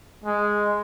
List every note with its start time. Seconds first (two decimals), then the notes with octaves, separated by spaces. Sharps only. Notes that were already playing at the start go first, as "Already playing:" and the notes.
0.24 G#3